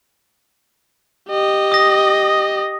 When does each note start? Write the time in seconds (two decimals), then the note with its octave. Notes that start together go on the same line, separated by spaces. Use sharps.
1.30 G4 D#5
1.72 D#6 A#6